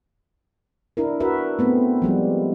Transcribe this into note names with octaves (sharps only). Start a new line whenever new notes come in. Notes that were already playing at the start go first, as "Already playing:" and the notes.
D4 E4 A#4
F#4 A#4 B4 E5
A3 B3 C4
F3 G3 G#3